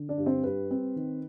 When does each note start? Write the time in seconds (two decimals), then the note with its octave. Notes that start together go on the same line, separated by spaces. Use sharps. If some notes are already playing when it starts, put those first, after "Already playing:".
Already playing: D3
0.09 D4 D5
0.17 G2
0.26 C4 C5
0.44 G3 B4
0.71 C4
0.96 D#3